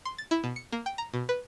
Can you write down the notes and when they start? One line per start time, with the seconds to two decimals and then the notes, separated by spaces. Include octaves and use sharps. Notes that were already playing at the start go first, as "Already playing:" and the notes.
0.05 C6
0.18 A6
0.31 E4
0.44 B2
0.56 C#7
0.72 A#3
0.86 G5
0.98 A#5
1.14 B2
1.29 B4